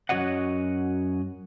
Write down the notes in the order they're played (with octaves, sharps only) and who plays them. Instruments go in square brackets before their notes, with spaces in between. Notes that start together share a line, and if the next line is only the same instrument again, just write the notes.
[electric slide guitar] F#2 E3 F#4 C#5 D#5 F#5